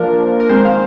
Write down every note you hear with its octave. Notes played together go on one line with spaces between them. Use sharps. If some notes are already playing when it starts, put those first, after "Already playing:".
Already playing: F3 A#3 D4 A#4
A#4
D#3 G#3 C4 C5
F5